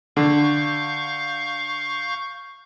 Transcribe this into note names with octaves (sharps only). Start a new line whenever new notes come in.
D3 F5 C#6 G6